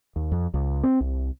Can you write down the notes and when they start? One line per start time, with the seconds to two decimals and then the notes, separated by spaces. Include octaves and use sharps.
0.16 D#2
0.32 F2
0.54 C#2
0.83 C4
1.01 C2